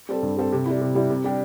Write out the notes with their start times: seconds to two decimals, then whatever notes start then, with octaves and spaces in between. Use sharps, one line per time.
0.09 G3 C4 A4
0.23 G2
0.37 G3 C4 A4
0.52 C3
0.66 G3 E4
0.81 C3
0.95 G3 E4
1.10 C3
1.24 G3 D4 G4